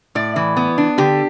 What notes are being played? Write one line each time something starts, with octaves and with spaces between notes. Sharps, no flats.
A2 D5
E3
B3
D4
D3 G4